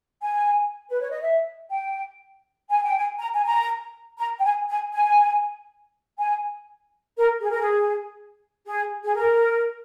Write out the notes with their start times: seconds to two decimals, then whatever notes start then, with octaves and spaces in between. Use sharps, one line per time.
0.21 G#5
0.90 B4
1.01 C#5
1.11 D#5
1.21 E5
1.70 G5
2.71 G#5
2.83 G5
2.97 G#5
3.19 A#5
3.34 G#5
3.45 A#5
4.19 A#5
4.39 G5
4.43 G#5
4.69 G#5
4.93 G#5
6.18 G#5
7.18 A#4
7.42 G#4
7.51 A#4
7.60 G#4
8.66 G#4
9.04 G#4
9.16 A#4